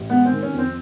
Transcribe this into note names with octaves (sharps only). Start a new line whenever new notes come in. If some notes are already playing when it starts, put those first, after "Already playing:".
Already playing: A1
G#3 B3
C4
D#3
C#4
F2
C4